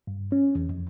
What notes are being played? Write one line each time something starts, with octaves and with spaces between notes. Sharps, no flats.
G2
C#4
E2
F2